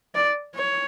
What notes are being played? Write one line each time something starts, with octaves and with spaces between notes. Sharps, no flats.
D5
C#5